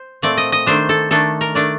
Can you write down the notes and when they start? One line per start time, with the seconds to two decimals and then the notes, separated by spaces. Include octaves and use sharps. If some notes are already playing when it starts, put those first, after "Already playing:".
Already playing: C5
0.22 A#2 A3 C4 D5
0.37 D#5
0.52 D#5
0.67 D#3 A3 D4 C5
0.89 A4
1.11 D#3 A3 D4 A4
1.41 A#4
1.55 D#3 A3 D4 D5